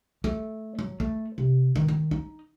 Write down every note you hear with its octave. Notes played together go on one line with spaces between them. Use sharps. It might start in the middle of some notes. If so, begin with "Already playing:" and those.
A3
F#3
A3
C3
D#3
D#3
D#4